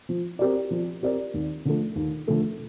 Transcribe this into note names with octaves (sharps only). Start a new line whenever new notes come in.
F3
C4 G4 A#4 D5
F3
C4 G4 A#4 D5
D#2
D3 F3 A3
D#2
D3 F3 A3